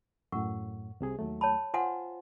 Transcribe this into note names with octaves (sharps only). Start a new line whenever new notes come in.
F#2 A2 A#4 F#5 C#6
C2 C3 G#4
D#2 F#3 A3
C#5 A5 B5
F4 C5 F#5 G#5 C6